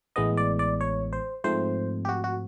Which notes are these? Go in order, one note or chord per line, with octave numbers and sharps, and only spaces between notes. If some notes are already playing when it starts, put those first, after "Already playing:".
A1 A2 E3 G#3 B3 D#5
D5
D5
C#5
C5
G#2 F3 A3 C4 C5
G4
F#4
F#4